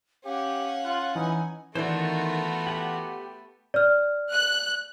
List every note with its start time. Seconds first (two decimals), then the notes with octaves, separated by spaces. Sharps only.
0.25 C#4 G4 F5 F#5
0.85 F4 F#6
1.15 E3 D#4 G#5
1.75 D#3 E3 A3 B3 D4 F4 F#4 C5
2.67 G4 F#5
3.74 D5 F6
4.32 F#6